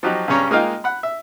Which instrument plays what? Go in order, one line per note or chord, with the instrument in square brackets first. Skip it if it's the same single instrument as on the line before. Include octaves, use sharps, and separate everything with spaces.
[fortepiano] F3 F#3 D#4 F#4 G4
G2 C#3 G3 C#4 C#5 A#5
G#3 A#3 D#4 F4 F5 G5
F#5 B5
E5